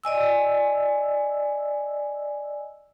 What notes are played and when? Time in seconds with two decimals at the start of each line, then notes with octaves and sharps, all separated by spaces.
0.04 D5 D#5 G#5 E6